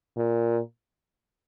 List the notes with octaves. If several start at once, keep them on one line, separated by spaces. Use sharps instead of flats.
A#2